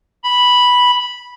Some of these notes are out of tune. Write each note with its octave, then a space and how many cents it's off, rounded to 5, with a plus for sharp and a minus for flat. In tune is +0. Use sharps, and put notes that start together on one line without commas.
B5 -5